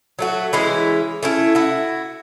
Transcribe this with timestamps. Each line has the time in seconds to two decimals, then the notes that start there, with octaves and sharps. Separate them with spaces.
0.19 F#3 A3 F#4
0.53 E3 G#3 C#4 E4
1.23 A3 C#4 E4
1.55 E4 F#4